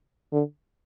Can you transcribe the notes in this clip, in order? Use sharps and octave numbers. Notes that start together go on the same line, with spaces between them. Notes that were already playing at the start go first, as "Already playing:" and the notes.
D3